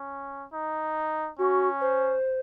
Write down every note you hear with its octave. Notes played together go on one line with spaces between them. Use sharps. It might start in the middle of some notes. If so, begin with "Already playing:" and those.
Already playing: C#4
D#4
C#4 F#4
C5